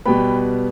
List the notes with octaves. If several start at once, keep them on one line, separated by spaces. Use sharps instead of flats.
B2 G3 B3 G5 B5